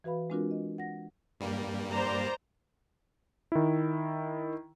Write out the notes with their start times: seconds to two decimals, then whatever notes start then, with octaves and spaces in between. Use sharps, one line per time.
0.04 E3 F#4 B4 F5 B5
0.30 G#3 C4 D4 F4 F#4 A#4
0.51 D#5
0.78 F#5 A#6
1.40 G2 G3 A#3
1.92 C5 D5 A#5
3.52 D#3 E4